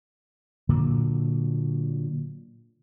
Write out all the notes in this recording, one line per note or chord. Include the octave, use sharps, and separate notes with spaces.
A#2 D3 F#3